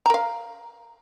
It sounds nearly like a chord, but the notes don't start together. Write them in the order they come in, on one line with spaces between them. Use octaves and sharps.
A#5 A#4 F5